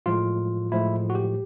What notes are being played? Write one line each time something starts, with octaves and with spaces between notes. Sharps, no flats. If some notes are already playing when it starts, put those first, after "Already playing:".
A2 F3 G#3 F4
A2 F3 G#3 E4
F#4
G4